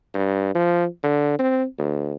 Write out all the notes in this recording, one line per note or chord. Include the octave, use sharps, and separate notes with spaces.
G2
F3
D3
C4
D2